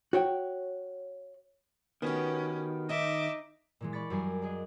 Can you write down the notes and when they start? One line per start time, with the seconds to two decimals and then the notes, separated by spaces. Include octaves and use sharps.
0.13 F#4 C#5 G5
2.02 D#3 B3 C#4 F#4 G4
2.89 D#4 D#5 E5 D6
3.81 A#2 E3 G#3
3.92 D5 B5 C#6 A6 B6
4.10 F#2 G3 A#4 G#5 C7
4.42 D4 G#4 D#5